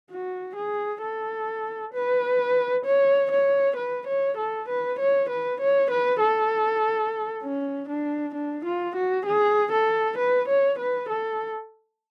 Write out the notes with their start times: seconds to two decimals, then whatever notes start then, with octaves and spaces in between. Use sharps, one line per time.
0.11 F#4
0.56 G#4
1.02 A4
1.94 B4
2.85 C#5
3.31 C#5
3.76 B4
4.07 C#5
4.37 A4
4.68 B4
4.99 C#5
5.29 B4
5.60 C#5
5.90 B4
6.21 A4
7.43 C#4
7.89 D4
8.34 D4
8.65 F4
8.96 F#4
9.26 G#4
9.72 A4
10.18 B4
10.48 C#5
10.78 B4
11.09 A4